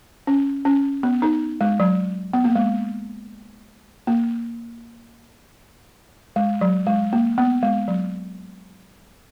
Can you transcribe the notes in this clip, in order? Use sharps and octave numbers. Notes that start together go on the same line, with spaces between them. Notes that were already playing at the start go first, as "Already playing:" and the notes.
C#4
C#4
B3
D#4
G#3
F#3
B3
A#3
G#3
A#3
G#3
F#3
G#3
A#3
B3
G#3
F#3